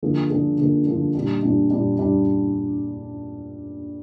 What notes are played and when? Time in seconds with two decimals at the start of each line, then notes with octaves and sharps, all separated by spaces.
0.03 D3 F3 A#3 D4 G#4
0.30 D3 F3 A#3 D4 G#4
0.58 D3 F3 A#3 D4 G#4
0.87 D3 F3 A#3 D4 G#4
1.15 A#2 G3 D4
1.43 A#2 G3 D4
1.70 A#2 G3 D4
1.99 A#2 G3 D4